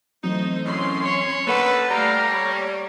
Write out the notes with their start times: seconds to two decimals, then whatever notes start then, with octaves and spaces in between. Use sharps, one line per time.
0.24 E3 F#3 A3 C4 D#4 C5
0.65 F#2 A2 C#4 C6
1.05 C#5
1.47 D3 D#3 A#3 A4 B4 F#5
1.90 G3 A3 F5 G5 A#5
2.29 C#5